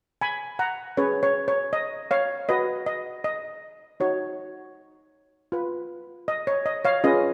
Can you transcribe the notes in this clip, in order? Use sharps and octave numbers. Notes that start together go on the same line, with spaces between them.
G#5 B5
F#5 A#5
C#4 G#4 B4 C#5
C#5
C#5
D#5
C#5 F5
F#4 B4 D#5
D#5
D#5
D#4 F#4 C#5
F4 B4
D#5
C#5
D#5
C#5 F5
C#4 F4 G#4 B4 D#5